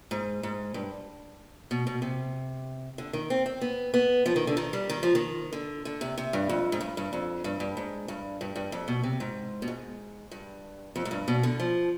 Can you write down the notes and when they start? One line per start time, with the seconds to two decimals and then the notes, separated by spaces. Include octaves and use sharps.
0.11 G#2
0.43 G#2
0.74 G2
1.71 B2
1.87 B2
2.02 C3
2.98 D3
3.13 D#3
3.30 C4
3.46 C4
3.61 B3
3.94 B3
4.26 F3
4.36 D#3
4.47 D3
4.57 D#3
4.73 G3
4.90 D#3
5.03 F3
5.15 D#3
5.53 D3
5.85 D3
6.01 C3
6.18 C3
6.33 G2
6.49 F2
6.72 G#2
6.81 G2
6.97 G2
7.13 F2
7.44 G2
7.60 G2
7.77 G#2
8.08 G2
8.41 G2
8.56 G2
8.72 F2
8.88 B2
9.04 C3
9.20 G#2
9.62 B2
9.68 G#2
10.31 G2
10.96 F2
11.05 G#2
11.11 G2
11.28 B2
11.43 D3
11.60 F3